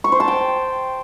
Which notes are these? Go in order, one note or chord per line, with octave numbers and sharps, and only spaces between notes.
C#6
C5
A5
G5